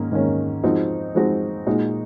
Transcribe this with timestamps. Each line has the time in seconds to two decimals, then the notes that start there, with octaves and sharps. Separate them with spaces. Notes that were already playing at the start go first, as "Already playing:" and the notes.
Already playing: G#2 D#3 A#3 C#4
0.12 G#2 D#3 A#3 C#4
0.64 F3 G#3 C4 D#4 F#4
1.15 F3 G#3 C4 D#4 F#4
1.66 A#2 G#3 D#4 F#4